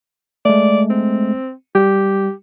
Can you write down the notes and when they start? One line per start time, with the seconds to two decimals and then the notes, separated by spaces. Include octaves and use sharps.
0.45 G#3 A3 D5
0.90 C4
1.75 G3 G4